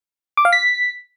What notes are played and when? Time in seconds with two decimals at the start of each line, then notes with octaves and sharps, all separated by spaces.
0.37 D6
0.45 F5
0.53 B6